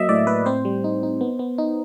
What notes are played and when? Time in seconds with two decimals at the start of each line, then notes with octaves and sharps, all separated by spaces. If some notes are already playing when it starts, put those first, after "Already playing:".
Already playing: F#3 A#3 D#5 E5
0.09 A2 D5
0.27 A2 B4
0.46 C4 C5
0.65 G3
0.84 D#4
1.03 D#4
1.21 B3
1.39 B3
1.58 D#4